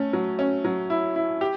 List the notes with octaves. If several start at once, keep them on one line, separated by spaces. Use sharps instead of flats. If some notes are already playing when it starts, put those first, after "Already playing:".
Already playing: A3 C#4
F#3
C#4
F#3
E4
E4
G4